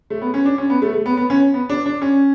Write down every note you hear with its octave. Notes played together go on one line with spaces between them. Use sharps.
A3
B3
C#4
D4
C#4
B3
A3
A3
B3
B3
C#4
B3
D4
D4
C#4